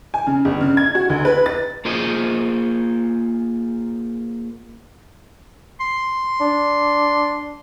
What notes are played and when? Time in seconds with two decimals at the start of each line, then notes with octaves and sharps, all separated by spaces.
0.14 G#5
0.27 C#3
0.45 G1
0.61 C#3
0.77 G#6
0.95 F#4
1.10 D2
1.25 B4
1.46 A6
1.85 A#3 F4 G#4 C5 D#5
5.80 C6
6.40 D4